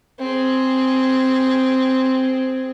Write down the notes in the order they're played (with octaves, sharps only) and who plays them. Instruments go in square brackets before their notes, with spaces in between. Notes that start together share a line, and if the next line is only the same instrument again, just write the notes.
[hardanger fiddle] C4 G#4